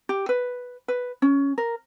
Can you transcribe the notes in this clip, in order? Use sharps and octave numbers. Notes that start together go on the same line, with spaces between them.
G4
B4
B4
C#4
A#4